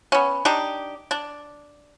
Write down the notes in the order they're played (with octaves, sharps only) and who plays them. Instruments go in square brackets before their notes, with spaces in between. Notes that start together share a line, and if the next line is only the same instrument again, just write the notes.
[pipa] B3 C#4
D4 D#4 G4
D4